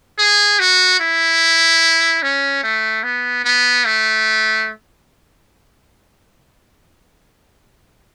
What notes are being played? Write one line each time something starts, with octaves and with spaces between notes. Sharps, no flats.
G#4
F#4
E4
C#4
A3
B3
B3
A3